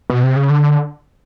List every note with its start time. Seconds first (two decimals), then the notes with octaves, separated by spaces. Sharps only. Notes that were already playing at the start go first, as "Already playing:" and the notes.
0.10 B2
0.24 C3
0.36 C#3
0.50 D3